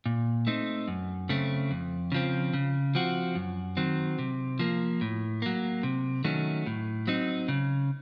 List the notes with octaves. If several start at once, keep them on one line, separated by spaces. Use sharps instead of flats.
A#2
A3 C4 D#4
F#2
C#3 A3 C4
F2
C#3 F3 C4
C#3
F3 C4 F#4
F#2
D#3 F#3 C4
C3
F3 A#3
A2
F#3 A#3
C3
D#3 F#3 A3 C#4
A2
F#3 C4 D#4
C#3